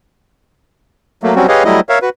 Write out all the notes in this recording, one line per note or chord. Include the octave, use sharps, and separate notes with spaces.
F#3 A3 A#3
F#3 G3 C4 C#4 F#4
G4 G#4 B4 C#5 D#5 F5
F#3 G3 A3 E4 D#5
A#4 C#5 E5 F5
F#4 B4